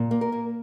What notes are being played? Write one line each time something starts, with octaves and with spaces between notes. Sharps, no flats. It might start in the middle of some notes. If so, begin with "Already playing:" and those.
Already playing: A#2
A#3
A#4
A#3